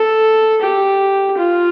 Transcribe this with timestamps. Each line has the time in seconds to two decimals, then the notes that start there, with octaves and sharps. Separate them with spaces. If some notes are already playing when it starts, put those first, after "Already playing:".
Already playing: A4
0.62 G4
1.37 F4